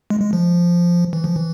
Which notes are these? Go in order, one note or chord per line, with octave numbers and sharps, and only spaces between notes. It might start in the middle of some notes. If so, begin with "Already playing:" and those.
G#3
G#3
F3
E3
F3
E3